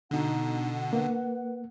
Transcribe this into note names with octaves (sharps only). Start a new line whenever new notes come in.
B2 D3 D#4 F#5
A#3 B4